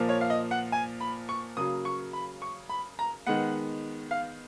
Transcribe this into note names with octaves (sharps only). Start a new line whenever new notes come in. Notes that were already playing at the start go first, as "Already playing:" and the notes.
Already playing: A#2 F3 A#3
C#5
F5
D#5
F#5
G#5
B5
C#6
C#3 F#3 A#3 D#6
C#6
B5
C#6
B5
A#5
D#3 G#3 B3 F#5
F5